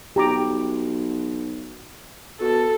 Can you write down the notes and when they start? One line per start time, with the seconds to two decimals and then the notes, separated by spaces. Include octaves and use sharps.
0.16 B1 G4 A#5 D6
2.41 B2 A4